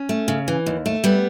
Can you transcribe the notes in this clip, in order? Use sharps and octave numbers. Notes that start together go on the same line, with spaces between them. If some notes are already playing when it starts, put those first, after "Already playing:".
Already playing: C#4
A3
C#3
E3
D#2
A3
G3 B3